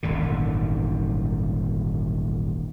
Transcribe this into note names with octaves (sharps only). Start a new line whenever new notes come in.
D#1 G#1 F#2 D3